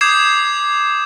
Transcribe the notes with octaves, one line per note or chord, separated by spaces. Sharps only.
D6 D#6 G6 G#6 C7 E7